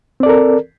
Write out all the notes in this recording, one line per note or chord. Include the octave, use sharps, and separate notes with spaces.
C4 A4 A#4 D5